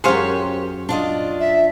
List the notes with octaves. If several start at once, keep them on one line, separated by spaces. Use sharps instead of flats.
F#2 G4 G#4 C5 C#5 F5 F#5
D4 F4 D#5
E5